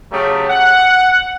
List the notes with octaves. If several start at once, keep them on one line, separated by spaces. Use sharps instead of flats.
C#3 F#3 A3 G4
F#5